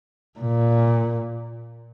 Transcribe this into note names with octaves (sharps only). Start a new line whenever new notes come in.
A#2